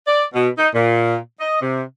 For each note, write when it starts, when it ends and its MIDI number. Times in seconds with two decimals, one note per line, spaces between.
0.07 0.24 74
0.34 0.48 47
0.57 0.68 63
0.73 1.16 46
1.40 1.59 75
1.61 1.82 48